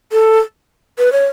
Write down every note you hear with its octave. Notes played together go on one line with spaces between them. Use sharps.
A4
B4
C#5